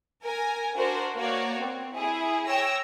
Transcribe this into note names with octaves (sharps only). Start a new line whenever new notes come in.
A#4 G#5
D4 F#4 A#4 C5
A#3 F#4 C#5 D5
C4
E4 G#4
C#5 G5 E6 A#6